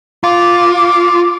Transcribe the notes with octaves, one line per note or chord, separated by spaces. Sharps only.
F4 D6